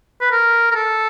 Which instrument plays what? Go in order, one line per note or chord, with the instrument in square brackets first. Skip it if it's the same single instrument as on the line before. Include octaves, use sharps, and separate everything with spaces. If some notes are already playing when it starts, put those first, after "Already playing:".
[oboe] B4
A#4
A#4
A4